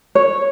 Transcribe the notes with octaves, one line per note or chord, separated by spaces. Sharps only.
C#5